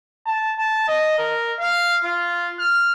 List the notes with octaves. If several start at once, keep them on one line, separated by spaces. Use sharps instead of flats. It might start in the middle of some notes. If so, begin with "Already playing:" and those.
A5
A5
D#5
A#4
F5
F4
F6